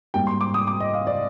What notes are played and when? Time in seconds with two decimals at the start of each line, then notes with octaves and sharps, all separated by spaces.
0.14 G#2 G3 A#3 G5
0.27 C6
0.41 D6
0.54 D#6
0.67 D6
0.80 D#5
0.94 F5
1.07 D5